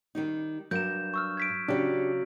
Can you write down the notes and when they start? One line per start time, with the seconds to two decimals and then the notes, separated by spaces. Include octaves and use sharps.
0.15 D#3 G3 D#4
0.71 G2 F#3 A#4 G6 E7
1.14 C#6 E6 F6
1.37 G#6 B6 D7
1.68 C#3 F#3 D4 G4